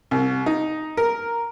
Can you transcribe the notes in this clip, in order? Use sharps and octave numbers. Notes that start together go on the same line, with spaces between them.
C2
D#4
A#4